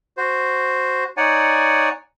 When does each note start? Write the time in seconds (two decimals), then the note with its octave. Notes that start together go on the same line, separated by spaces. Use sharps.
0.17 F#4 C5
1.17 D#4 C#5 D5 F#5 G#5